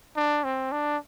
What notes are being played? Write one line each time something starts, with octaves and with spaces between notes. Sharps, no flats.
D4
C4
D4